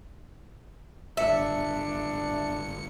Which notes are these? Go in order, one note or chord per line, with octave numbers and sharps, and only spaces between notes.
G1 D4 E5 C#7